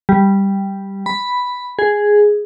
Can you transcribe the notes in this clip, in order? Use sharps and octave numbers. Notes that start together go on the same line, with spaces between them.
G3
B5
G#4